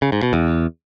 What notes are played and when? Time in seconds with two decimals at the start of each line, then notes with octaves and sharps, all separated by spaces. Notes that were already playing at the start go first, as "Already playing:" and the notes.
0.02 C#3
0.12 G#2
0.23 B2
0.33 E2